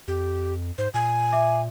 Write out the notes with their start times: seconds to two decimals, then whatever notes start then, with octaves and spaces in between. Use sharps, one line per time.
0.08 F2 G4
0.78 G#2 C5
0.94 A#2 G#5
1.32 E5 D6